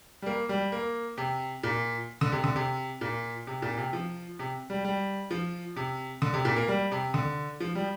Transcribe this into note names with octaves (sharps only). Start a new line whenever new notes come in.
G3
A#3
G3
A#3
C3
A#2
D3
C3
D3
C3
A#2
C3
A#2
C3
F3
C3
G3
G3
F3
C3
D3
C3
A#2
A#3
G3
C3
D3
F3
G3